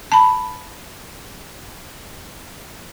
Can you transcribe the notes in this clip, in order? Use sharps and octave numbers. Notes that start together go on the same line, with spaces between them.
A5 B5